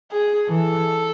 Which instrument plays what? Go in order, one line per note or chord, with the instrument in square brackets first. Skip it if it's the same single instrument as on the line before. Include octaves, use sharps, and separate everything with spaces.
[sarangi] G#4
[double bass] E3 [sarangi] A4